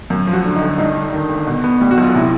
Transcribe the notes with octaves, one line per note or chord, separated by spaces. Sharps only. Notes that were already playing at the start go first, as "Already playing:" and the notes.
F#2
F3
F#4
D3
D#4
G1
G2 D#4
G1
D#3
G1
B2
B3
G3
F#4
B1
F4
C3 E4